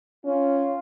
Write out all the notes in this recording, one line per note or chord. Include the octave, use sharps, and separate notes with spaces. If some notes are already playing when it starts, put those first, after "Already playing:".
C#4 F4